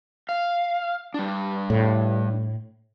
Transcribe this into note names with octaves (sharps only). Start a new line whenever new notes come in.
F5
G3 D4
A2